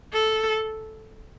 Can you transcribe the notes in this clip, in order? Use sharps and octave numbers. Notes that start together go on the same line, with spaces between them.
A4